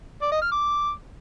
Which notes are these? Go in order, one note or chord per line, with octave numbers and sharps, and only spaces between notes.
D5
D#5
F6
D6